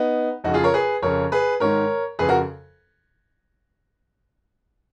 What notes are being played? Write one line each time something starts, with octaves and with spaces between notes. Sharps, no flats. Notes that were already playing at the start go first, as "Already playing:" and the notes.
Already playing: B3 D#4
F2 C#3 D#4 F#4
F4 G#4
A#4 C#5
G#4 B4
F2 C#3 A#4 C#5
G#4 B4
G#2 D#3 A#4 C#5
F2 C#3 G#4 B4
F#4 A#4